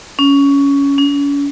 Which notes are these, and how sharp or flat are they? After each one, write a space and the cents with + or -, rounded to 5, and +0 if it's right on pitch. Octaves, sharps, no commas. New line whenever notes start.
C#4 +15
C#4 +40